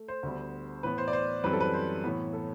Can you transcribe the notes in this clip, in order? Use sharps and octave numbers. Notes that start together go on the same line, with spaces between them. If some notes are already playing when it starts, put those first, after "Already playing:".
Already playing: A3
C5
D2 D3 G3 B3
A2 E3 B3 B4
C5
D5
C5
F#2 E3 G3 C4 B4
A4
B4
C5
A2 E3 B3
A4